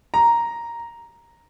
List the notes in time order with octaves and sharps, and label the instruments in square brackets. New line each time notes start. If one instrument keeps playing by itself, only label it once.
[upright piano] A#5